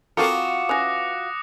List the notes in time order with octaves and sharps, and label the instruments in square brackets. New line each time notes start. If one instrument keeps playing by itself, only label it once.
[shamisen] C4 A4 A#4 [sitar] F4 F#4 [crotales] D6 D#6 C#7
[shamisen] E3 C#4 [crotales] D#6 F#6 A#6